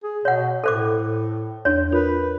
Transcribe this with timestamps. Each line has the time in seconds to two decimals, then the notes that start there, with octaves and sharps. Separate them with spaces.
0.03 G#4
0.25 B2 C#5 F#5
0.64 A2 A4 C5 D6
1.65 E2 D4 C#5
1.92 F4 A#4 B4